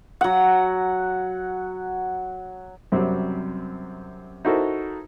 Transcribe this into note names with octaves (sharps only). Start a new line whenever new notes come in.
F#3 F#5
F#2 C3 F#3 G3 C4
D#4 E4 F#4 A4 A#4 C5